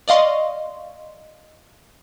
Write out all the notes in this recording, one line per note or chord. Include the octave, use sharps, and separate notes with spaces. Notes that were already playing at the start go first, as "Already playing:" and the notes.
D5 D#5 F5 C6 C#6